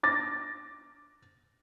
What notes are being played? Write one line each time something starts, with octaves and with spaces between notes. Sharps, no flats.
D6 A6 A#6